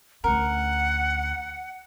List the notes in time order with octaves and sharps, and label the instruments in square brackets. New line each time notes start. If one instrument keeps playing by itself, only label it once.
[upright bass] D2 C#4 [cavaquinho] A#4 [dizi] F#5